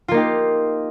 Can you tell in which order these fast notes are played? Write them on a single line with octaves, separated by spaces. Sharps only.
F4 A#3 D#4 G4